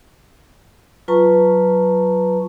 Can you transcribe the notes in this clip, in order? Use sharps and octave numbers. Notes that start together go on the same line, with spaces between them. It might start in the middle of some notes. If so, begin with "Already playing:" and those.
F#3 F4 B4 A5 A#5 C#6